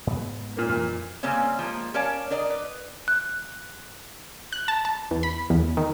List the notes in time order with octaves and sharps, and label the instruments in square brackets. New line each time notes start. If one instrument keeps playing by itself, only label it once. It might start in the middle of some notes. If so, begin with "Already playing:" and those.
[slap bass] G#2 B3
[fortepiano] A#2 A#3
[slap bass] F2 E3 [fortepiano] A#2
[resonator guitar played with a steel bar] C#3 G3 A#3 C4 C#4
F3 G#3 A#3
C#4 A#4 C#5 D5 F5 A5
D4 A#4 D5 D#5
B4
[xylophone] F#6
[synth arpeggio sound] F#6
A5
A5
E2
B5
E2
D#3